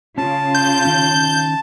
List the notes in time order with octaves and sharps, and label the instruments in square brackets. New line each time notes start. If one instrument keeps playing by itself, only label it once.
[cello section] C#3 F4 [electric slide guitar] C#4 [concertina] A5
[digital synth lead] G6
[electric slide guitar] D#3 C#4